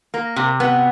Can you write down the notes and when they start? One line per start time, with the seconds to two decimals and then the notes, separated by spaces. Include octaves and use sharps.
0.14 A#3
0.36 C3
0.60 B3